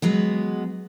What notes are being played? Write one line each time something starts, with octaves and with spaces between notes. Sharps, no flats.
F#3 G#3 B3